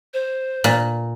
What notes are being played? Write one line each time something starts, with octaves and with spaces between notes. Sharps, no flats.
C5
A#2